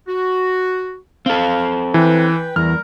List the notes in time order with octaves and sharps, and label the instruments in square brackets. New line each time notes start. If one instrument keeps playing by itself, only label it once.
[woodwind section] F#4
[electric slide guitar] C4 A4 [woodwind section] F5
[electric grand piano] E3 [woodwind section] B4 G5
[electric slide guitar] E2 [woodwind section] G3 A#4 [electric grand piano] F6